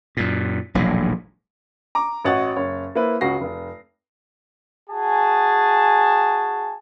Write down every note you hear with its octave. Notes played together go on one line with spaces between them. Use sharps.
F#2 A#2
E1 A#1 A2 F#3
A#5 D6
A1 F#4 C#5 D#5 F#5 A6
F#1 C#5
A#3 E4 B4 C5
C#2 C#3 F#4 A#6 C7
F1
F#4 G#4 G#5 A5